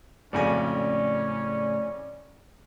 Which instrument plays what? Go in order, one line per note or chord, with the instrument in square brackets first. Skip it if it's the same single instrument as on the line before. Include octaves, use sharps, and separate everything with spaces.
[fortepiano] G#1 F2 G#5 [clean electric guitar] A2 C#3 [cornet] C#4 [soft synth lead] D5